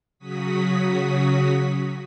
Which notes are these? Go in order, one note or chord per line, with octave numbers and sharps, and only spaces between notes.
C#3 F#3 F#4 D#6 B6